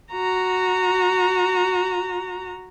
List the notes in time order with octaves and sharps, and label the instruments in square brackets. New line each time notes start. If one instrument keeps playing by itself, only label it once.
[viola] F#4 A#5